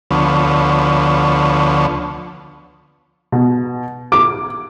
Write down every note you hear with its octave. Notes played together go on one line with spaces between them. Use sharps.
D2 D3 F3 B3 C#5
B2
D6